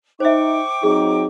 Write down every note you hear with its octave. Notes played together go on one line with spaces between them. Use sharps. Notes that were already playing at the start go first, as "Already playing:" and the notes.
D#4 C5 E5 G5 C#6 D6
F#3 C4 D#4 G#4